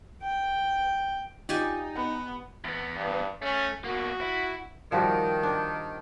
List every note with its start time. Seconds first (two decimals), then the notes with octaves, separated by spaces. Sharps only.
0.22 G5
1.49 D#4 F4 G4 D5 G#5
1.95 B3 F#5
2.64 E2 B3
2.95 G2
3.42 A3 C#4
3.85 B2 A#3 F#4
4.21 E4
4.92 D#3 F3 G3 F#4
5.43 D4